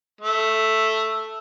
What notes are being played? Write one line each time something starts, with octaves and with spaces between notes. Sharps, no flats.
A3